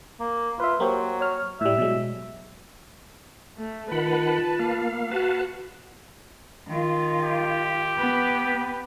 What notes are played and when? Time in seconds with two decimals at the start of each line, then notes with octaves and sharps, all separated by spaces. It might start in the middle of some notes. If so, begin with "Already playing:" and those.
0.20 A#3
0.60 F4 B4 E5
0.80 F#3 A#3 G4 C5
1.21 C#5 F6
1.61 A2 G3 E5
1.78 B2 F#3 G#3
3.58 A3
3.92 D#3 F4 B4 F#5 A5 B5
4.59 A#3 F5
5.11 F#4 B4 F5 A5
6.68 D#3 F4
7.23 G4
7.98 B3 B4